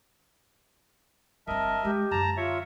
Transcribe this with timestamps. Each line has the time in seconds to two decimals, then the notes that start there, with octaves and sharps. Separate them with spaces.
1.47 G1 C4 A#4 D#5 E5 A5
1.85 G#3 G4
2.11 F#2 D3 A5 A#5
2.37 F4 C#5 E5